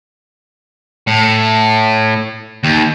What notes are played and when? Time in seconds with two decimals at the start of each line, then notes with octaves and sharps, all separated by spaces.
1.07 A2
2.64 D#2